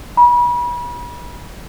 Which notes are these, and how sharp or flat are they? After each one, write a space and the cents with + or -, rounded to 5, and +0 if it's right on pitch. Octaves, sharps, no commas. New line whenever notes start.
B5 -35